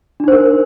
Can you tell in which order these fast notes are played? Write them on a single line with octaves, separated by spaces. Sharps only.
D4 D#4 C5 A#4